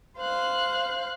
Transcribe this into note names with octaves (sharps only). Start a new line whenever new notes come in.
C5 F5 F#6